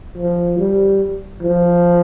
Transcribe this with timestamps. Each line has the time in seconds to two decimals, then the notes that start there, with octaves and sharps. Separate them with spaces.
0.17 F3
0.59 G3
1.42 F3